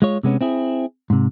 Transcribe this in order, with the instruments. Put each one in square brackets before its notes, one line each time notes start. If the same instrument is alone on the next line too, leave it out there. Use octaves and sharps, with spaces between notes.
[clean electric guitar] G#3 F4 C#5
C3 G#3 B3 C#4
C4 E4 G#4
G#2 C3